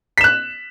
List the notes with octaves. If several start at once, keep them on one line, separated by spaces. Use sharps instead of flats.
F#6 B6 E7